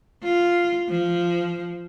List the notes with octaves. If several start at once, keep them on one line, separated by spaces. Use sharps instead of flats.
F4
F3